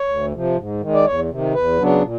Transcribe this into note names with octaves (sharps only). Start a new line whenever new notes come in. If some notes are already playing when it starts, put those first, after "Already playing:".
Already playing: C#5
D2
C3 F3
G#2
D#3 G#3
D5
E2 C#5
C3 D#3
E2 B4
C#3 F#3 B3 D4
A#2